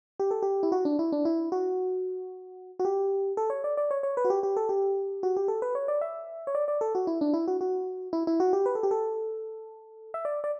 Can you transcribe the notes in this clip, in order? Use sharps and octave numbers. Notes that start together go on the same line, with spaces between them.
G4
A4
G4
E4
F#4
D4
E4
D4
E4
F#4
F#4
G4
A4
C#5
D5
D5
C#5
C#5
B4
F#4
G4
G4
A4
G4
F#4
G4
A4
B4
C#5
D5
E5
C#5
D5
D5
A4
F#4
E4
D4
E4
F#4
F#4
E4
E4
F#4
G4
B4
A4
G4
A4
E5
D5
D5